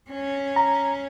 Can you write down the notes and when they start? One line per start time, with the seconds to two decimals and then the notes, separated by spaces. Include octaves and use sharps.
0.10 C#4
0.56 A#5